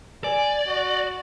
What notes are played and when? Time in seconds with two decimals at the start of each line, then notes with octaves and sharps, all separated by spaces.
0.24 D5 G#5
0.67 F#4